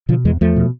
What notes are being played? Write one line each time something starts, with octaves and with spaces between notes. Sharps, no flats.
B2 D3 F3
E2 E3 G#3
E2 F3 A3
B2